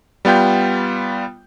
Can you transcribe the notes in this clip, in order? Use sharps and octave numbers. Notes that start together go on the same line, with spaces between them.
G3 B3 F4 G5 G6